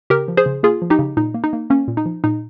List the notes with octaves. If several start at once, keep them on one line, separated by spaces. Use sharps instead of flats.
C#3 G4 A#4
F3
G#4 C5
C#3
A#3 F4 G#4
F3
D#4 G4
C#3
A#2 D#4
A#3
D#4
A#3
A#3 C#4
A#2
D#4
F3
A#2 D#4